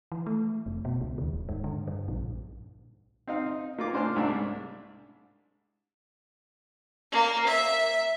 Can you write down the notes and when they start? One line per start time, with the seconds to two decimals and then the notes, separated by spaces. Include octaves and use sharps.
0.12 E3
0.27 A3
0.66 F1
0.85 B2
1.01 C#2
1.18 D#2
1.33 D1
1.49 G#2
1.64 D3
1.88 G2
2.08 A#1
3.27 C4 D#4 F5
3.46 D#4
3.78 A#3 F4 D6
3.93 A2 D4 C5 G#5 D6 F6
4.16 C2 G#2 D4
7.12 A#3
7.47 E5